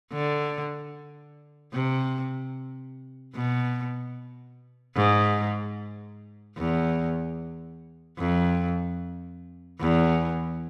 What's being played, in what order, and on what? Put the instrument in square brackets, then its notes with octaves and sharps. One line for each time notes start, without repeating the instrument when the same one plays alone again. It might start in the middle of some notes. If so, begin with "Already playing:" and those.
[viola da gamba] D3
C3
B2
G#2
E2
F2
E2